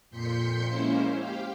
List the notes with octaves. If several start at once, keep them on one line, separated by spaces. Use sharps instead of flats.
F2 A#2 C6 G6 B6 C#7
G#3 A#3 C#4 E4 C5
G4 F5 G5